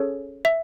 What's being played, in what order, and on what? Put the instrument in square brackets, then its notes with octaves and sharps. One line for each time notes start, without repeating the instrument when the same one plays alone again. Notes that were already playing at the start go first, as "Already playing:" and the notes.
Already playing: [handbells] C#4 G#4 A4 C#5
E5